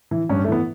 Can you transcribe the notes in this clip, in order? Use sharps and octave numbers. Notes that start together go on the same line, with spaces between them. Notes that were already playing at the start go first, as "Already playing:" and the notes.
E3
G2 C#4
A3
E3 B3